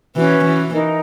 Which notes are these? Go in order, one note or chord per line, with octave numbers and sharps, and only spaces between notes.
E3 C#4 F#4 B4
E3
D#4 A#4 D#5